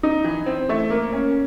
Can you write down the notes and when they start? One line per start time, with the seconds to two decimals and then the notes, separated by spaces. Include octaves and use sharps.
0.03 D#4
0.24 E3
0.46 C4
0.69 A3
0.90 A#3
1.12 C#4